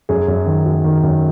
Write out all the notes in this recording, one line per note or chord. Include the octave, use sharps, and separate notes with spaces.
F#2 G#4
F#2
D#3
F#3
D#3
F#2